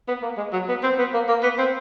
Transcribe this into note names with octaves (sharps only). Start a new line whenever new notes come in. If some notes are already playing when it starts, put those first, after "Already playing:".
B3
A#3
G#3
F#3
B3
C4
B3
A#3
A#3
B3
C4